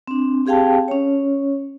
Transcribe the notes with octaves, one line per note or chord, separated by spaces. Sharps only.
C4 D4
C4 G4 G#4 F5 G5 A5
C#4 C#5